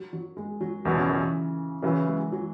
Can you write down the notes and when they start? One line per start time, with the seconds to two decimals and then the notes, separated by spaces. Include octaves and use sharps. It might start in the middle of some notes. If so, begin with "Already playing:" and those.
Already playing: F#3
0.13 F#3
0.37 G#3
0.61 F#3
0.85 E2 B2 E3 F#3
0.97 C#3
1.09 E3
1.82 C#3 E3 F#3 E4 B4
2.07 G#3
2.32 F#3